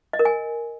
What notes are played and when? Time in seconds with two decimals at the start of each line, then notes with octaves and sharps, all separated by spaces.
0.13 D#5
0.19 A#4
0.25 G#5